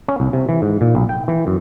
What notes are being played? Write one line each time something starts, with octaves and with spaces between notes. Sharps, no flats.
C#4
C2
C3
E3
G#2
A#2
B1
G5
E3
F#2